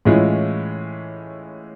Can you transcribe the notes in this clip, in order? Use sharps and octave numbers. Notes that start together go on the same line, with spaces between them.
A2 E3 G#3 C#4 F4